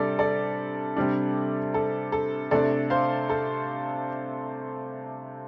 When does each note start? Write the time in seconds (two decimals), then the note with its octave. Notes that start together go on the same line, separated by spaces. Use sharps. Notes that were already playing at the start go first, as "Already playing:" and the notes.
Already playing: C3 G3 D4 A4 D5
0.19 A4 D5
0.97 C3 G3 D4
1.74 A4
2.12 A4
2.51 C3 A3 D4 A4 D5
2.90 C5 F5
3.30 A4